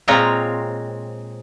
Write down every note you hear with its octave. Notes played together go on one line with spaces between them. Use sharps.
A#2 G#3 C4 F4 C#5 A#5